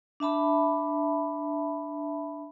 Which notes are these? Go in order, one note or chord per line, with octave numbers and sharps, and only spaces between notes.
D4 E5 A5 B5